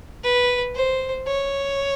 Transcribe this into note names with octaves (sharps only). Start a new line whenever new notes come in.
B4
C5
C#5